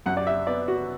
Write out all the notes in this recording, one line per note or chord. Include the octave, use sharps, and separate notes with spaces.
F#2 F#5
D5
E5
B3 D5
F#4